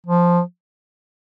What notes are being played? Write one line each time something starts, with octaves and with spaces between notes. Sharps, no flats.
F3